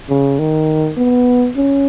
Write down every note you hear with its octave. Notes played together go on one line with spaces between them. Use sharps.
C#3
D#3
B3
C#4